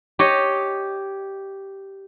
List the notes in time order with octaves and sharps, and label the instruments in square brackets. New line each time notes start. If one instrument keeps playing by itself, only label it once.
[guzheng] G4 C#5 D#5